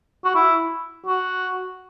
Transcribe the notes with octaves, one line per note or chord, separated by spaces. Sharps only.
F#4
E4
F#4